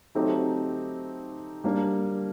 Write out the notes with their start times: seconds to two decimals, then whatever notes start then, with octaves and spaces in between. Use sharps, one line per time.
0.15 F#3 A3 C4 D#4 G4
1.64 G3 A#3 D4